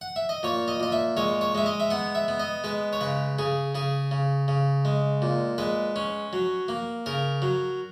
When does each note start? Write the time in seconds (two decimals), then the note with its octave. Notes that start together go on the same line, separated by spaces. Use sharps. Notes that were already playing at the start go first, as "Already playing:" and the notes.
0.01 F#5
0.16 E5
0.29 D#5
0.43 A#2 C#5
0.68 D#5
0.80 A#2 D#5
0.92 E5
1.17 G#3 C#5
1.41 C#5
1.55 G#3 E5
1.66 D#5
1.80 E5
1.90 B3 F#5
2.15 E5
2.28 B3
2.40 D#5
2.64 G#3 B4
2.93 C#5
3.01 C#3 B4
3.39 C#3 G#4
3.75 C#3 G#4
4.11 C#3
4.48 C#3
4.85 G#3
5.22 A#2
5.58 G#3 B4
5.96 C#4
6.33 F#3
6.68 A#3
7.06 C#3 A#4
7.42 F#3